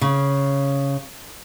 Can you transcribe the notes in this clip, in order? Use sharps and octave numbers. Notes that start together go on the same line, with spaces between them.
C#3